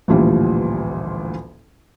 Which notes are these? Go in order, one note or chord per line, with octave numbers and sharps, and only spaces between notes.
A1 D2 A#2 E3 F3 G3